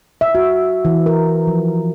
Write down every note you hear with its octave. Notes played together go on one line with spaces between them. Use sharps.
E5
F#4
E3
A#4
F3